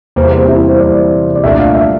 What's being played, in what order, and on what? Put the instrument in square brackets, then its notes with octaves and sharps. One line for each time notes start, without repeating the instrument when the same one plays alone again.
[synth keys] E2 C3 G3 A#3 [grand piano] C5
[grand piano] C5
E4
C5
D5
D5
[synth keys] C2 A#2 A3 D4 [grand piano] E5
[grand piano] F5
E5